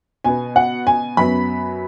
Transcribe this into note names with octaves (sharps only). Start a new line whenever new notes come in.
B2 B3 G#5
F#5
G#5
F#2 F#3 B3 B5